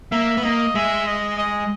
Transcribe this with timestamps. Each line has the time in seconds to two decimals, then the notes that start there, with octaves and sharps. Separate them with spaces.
0.12 A#3 E5
0.37 B3
0.43 A#3 D#5
0.75 G#3 E5
1.07 D#5
1.38 D#5